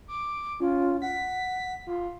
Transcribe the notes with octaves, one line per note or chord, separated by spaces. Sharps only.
D6
C#4 F4
F#5 B6
F4